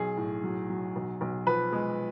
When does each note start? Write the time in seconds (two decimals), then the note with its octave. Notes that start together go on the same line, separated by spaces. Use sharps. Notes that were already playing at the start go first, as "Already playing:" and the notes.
Already playing: B1 G#4
0.17 A2
0.44 F#3
0.70 F#3
0.96 B1
1.21 B1
1.46 F3 B4
1.72 G#3